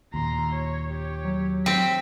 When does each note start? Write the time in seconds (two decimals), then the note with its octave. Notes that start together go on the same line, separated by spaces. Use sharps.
0.14 D#2 A#2 A#5 C6
0.53 C#5
0.90 G4 C#5
1.25 F#3
1.66 C4 B6